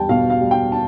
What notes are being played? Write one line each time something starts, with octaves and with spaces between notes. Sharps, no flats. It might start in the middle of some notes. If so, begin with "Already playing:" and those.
Already playing: E2 G3 G5 A5
B2 F5
F5
G3
G5
A5